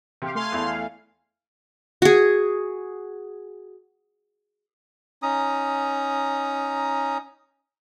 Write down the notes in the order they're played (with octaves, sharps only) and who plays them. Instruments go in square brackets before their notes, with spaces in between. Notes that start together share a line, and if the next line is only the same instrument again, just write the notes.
[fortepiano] C3 [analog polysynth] G4 F5
[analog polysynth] A3 F5 G#5 [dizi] C6
[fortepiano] E2 E4
[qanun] F#4 G#4
[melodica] C#4 D#4 A#5 D#6